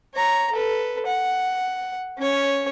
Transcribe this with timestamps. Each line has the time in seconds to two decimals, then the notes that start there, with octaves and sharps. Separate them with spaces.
0.15 C#5 A#5
0.52 A4 B4
1.07 F#5
2.18 C#4 C#5